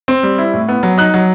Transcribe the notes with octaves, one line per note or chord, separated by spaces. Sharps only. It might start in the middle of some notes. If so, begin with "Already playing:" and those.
C4
G3
E4
A2
B3
F#3
D#4 F#6
F#3